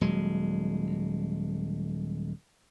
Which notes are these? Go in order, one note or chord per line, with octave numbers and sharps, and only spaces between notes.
D#1 F#3 G#3